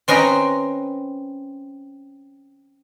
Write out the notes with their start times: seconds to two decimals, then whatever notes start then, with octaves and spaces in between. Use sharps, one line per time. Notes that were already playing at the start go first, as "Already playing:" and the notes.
0.08 C4 C#4 B4 D#5 G5 A#5